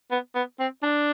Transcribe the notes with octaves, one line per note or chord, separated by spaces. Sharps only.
B3
B3
C4
D4